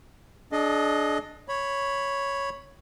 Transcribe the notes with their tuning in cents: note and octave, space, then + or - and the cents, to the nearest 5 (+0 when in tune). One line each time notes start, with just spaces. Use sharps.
D4 +0 G#4 +40 D#5 +0
C#5 +0 B5 +0